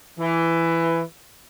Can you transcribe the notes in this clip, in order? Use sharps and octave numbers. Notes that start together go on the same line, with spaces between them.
E3